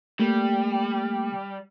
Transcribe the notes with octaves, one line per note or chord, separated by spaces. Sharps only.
G3 A3 A#3